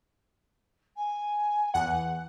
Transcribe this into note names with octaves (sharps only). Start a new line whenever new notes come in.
G#5
E2 F#5